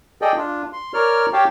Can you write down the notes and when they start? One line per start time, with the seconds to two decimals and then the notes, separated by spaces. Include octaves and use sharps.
0.22 G#4 A4 D5 D#5 G5
0.37 D4 F4
0.73 C6
0.94 A#4 C#5 D5 F6
1.33 G4 C#5 F5 G5 A5